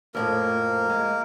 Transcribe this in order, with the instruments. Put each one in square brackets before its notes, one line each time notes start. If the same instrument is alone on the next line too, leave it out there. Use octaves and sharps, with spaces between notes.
[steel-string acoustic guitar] F2 A2 F3 [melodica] A#3 A#4
[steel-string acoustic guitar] G#3